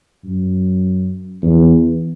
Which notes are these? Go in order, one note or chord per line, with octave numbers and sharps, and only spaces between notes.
F#2
E2